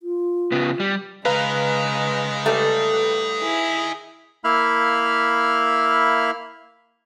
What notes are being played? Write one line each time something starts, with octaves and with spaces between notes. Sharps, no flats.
F4
C#3 B3
G3
C#3 G#3 D#4 A#4 B4 F5 A#5
G3 A3
E4 G#4
A#3 E4 E5 F5 B5 F6